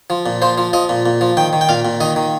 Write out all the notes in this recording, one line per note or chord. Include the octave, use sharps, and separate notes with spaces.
F3
A#2
F3 C5
F3
F3 D#5
A#2
A#2
F3
D#3 G5
D#3
G5
A#2 F5
A#2
D#3 D#5
D#3